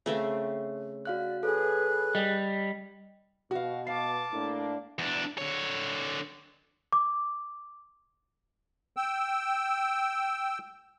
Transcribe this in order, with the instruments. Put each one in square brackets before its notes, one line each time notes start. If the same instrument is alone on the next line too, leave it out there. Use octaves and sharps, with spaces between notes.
[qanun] C#3 A3 C4 [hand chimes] C#5
[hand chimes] F#4 F5 F#6 [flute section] D5
[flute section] G#4 B4 F#6 [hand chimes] A4 C#5
[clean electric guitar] G3 [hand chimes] D#5
[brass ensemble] B2 [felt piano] F#4 F5
[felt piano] F5 C7 [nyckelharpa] A5 D6
[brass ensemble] A2 A#3 D4
[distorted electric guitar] E2 D4
D3 C#5
[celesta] D6
[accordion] G5 E6